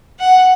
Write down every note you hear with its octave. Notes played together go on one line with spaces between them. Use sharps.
F#5